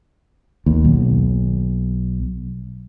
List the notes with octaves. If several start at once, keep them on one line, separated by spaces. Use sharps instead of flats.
D#2
B1